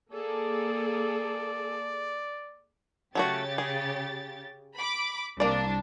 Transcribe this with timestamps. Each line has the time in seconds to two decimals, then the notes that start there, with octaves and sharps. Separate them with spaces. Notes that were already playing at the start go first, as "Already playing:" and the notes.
0.13 A#3 G#4 A4 D5
3.15 C#3 F#3 A3 F#4 G4 A6
3.58 G#4
4.77 B5 D6
5.40 C2 A#3 D4 D5